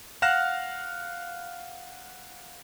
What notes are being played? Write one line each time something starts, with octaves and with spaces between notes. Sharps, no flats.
F5 F#5 F6 F#6 A#6 E7